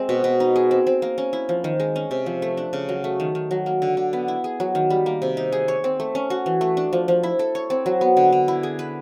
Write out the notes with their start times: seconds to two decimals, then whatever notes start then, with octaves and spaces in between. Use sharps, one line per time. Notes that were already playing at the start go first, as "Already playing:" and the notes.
Already playing: G#3 C4
0.09 B2
0.24 B2
0.40 D#4
0.56 G#4
0.71 C4
0.87 C4
1.02 A#3
1.18 C#4
1.33 E4
1.49 F3
1.64 D#3
1.80 G#3
1.96 C#4
2.11 C3
2.26 F3
2.42 A3
2.57 D4
2.73 C#3
2.89 F#3
3.04 A3
3.20 D#3
3.35 D#3
3.51 F#3
3.66 A#3
3.82 D3
3.97 D3
4.13 B3
4.28 E4
4.44 G#4
4.60 F#3
4.75 D#3
4.90 G3
5.06 A#3
5.22 C3
5.37 D#4
5.52 G#4
5.68 C#5
5.84 C4
6.00 A3
6.15 C#4
6.30 F#4
6.46 E3
6.61 A3
6.77 D4
6.93 F3
7.08 F3
7.23 E4
7.39 A4
7.55 C#5
7.70 C4
7.86 F#3
8.01 B3
8.17 D3
8.32 D3
8.48 E4
8.63 G#4
8.79 B4